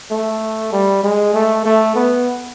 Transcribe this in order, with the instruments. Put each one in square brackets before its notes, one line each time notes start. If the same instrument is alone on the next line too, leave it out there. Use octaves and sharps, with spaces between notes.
[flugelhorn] A3
G3
G#3
A3
A3
B3